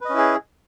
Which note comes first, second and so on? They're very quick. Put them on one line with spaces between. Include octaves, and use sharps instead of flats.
B4 D#5 C#4 E4 G#4